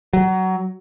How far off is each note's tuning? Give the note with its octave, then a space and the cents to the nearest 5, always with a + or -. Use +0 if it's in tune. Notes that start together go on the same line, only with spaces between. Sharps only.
F#3 +20